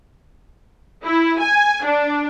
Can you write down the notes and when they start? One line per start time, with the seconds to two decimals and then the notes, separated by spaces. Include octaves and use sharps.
1.03 E4
1.40 G#5
1.84 D4